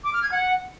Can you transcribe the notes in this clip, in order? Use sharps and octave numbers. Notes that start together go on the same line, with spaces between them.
D6
F6
G#6
F#5